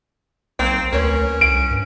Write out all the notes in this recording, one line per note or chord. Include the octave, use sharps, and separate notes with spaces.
B1 A#3 C4 G5
D2 C#4 A#4 B4 C#5
C2 D7
G2